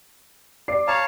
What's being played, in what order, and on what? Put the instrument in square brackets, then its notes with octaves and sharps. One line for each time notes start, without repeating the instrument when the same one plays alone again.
[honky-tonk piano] D5 D6 C7
[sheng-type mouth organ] C#5 F5 A5 [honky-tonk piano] A#5